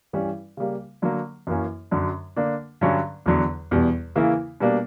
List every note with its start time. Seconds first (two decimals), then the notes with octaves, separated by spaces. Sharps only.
0.13 G2 E3 G3 C#4
0.57 C#3 G3 A#3
1.02 D3 F#3 A#3
1.47 F#2 E3 A#3 C#4
1.91 F#2 D3 F#3
2.36 D3 A#3 D4
2.81 G2 D3 F#3 C#4
3.26 E2 D3 F#3
3.71 E2 B2 G3
4.16 C#3 E3 A#3 E4
4.60 B2 G3 A#3 D4